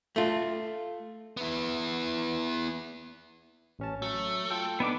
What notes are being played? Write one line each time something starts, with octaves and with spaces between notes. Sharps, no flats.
A3 F4
B3 E4
A1 C#4 A5
F#3 A3
F4 A4 G5
B3 D4 D#4 D6